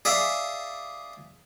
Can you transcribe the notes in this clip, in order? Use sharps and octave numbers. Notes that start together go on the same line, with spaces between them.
G#4 D5 E5 F5